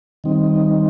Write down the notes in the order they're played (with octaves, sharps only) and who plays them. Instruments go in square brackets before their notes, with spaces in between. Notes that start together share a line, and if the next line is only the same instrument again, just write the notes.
[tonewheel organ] D#3 G3 C4 D#4